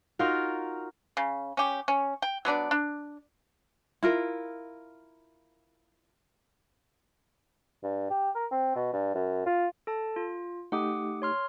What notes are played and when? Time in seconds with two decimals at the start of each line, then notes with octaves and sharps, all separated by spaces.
0.19 D#4 F4 F#4 A#4
1.17 C#3
1.57 C#4 G4
1.88 C#4
2.22 G5
2.45 F#3 B3 D4 D5
2.71 D4
4.03 E4 F4 A#4
7.83 G2
8.10 G4
8.35 A#4
8.51 C4
8.76 B2
8.93 G2
9.15 F#2
9.46 F4
9.87 A4 A5
10.16 F4
10.72 A3 D#4 G4 F#5 D6 D#6
11.22 C#5 C6 F6